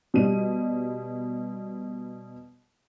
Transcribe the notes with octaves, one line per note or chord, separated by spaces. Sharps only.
B2 G3 D#7